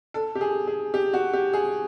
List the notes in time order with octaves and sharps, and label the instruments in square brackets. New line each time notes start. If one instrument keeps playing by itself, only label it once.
[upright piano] A4
G4
G#4
G#4
G4
F#4
G4
G#4